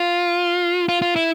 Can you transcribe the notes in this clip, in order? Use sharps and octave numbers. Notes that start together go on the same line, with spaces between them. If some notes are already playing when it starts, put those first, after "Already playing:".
Already playing: F4
F4
F4
E4